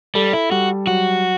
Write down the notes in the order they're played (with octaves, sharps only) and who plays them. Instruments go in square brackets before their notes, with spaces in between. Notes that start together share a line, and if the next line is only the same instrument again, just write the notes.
[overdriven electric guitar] G3 [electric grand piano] A4
[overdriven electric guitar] E4
[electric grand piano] G3 [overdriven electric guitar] F#4
[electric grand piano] F#3 [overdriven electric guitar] F#4